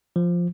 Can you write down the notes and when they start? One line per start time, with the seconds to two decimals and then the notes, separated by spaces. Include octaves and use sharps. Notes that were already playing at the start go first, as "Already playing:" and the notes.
0.16 F3